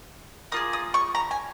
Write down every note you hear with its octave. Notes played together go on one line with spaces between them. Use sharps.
A#3 F4 G#4 D#6
D#6
C#6
A#5
G#5